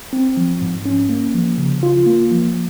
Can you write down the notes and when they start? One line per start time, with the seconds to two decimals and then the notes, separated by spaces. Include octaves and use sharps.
0.13 C4
0.37 F3
0.61 G#2
0.85 C#4
1.09 A#3
1.34 F3
1.58 C#3
1.83 F4
2.06 A#3
2.31 F3